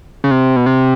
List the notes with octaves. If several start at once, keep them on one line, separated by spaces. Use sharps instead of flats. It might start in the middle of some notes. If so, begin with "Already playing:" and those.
C#3
C3
B2
C3